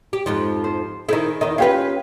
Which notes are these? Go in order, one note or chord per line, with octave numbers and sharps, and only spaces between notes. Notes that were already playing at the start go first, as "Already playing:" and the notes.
G4
F2 G#2 F3
C5
D#3 E4 G#4 C5 D#5
E2 D#3 D#5
C#4 F4 G4 B4 F5